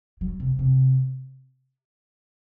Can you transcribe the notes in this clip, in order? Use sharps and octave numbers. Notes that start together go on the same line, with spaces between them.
F#3
C3
C3